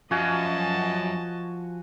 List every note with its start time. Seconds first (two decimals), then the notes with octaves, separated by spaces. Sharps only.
0.11 F#2 F3 F#4 D#5 F5 G#5 A5